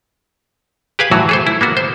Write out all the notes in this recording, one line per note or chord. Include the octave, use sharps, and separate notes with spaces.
G4 G#4 B4 F5 G#5
A2 E3 F#3 F#4
G#4 A4 C5
E4
A#3 B3 F#4
C5